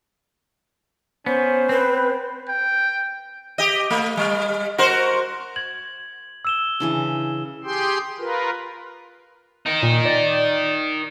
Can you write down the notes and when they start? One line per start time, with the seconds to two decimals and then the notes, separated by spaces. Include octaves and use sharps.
1.26 B3 C#4 C5
1.69 C4 B4
2.49 G5
3.58 G4 D#5
3.90 A3
4.17 G3
4.78 F#4 A#4 C5
5.56 G#6 F#7
6.45 E6 E7 G7
6.80 C#3 E3 D4
7.64 G4 G#4 G5 C6
8.19 F4 A#4 B4
9.66 D#4 A#4
9.83 A#2
10.05 D5